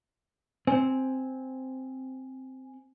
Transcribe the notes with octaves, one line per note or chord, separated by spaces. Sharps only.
C4 G#5